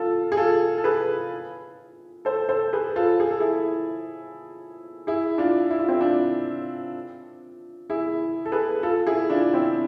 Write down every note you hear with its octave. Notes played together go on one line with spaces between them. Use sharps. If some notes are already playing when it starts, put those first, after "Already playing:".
Already playing: F4 A4
G#4
F4 A4
A4
G#4 B4
A4 C5
A4 C5
G#4 B4
F4 A4
G#4
A4
E4 G#4
E4 G#4
D4 F4
E4
F4
C4 E4
D4 F4
E4 G#4
A4
G#4 B4
F4 A4
E4 G#4
D4 F4
C4 E4